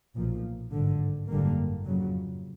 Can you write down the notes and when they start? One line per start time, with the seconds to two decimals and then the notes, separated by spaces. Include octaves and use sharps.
0.16 B1 A#2 F3
0.72 G#1 G2 D3
1.29 G#1 F#2 D3 G3 A#3
1.85 F2 C#3 F#3